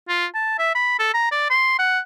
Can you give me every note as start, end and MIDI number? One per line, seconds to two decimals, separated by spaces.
0.08 0.25 65
0.34 0.56 81
0.58 0.73 76
0.75 0.95 83
0.99 1.09 69
1.14 1.27 82
1.31 1.49 74
1.50 1.78 84
1.79 1.99 78